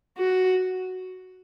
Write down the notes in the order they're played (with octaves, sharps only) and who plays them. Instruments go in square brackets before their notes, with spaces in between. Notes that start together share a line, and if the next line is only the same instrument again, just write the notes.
[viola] F#4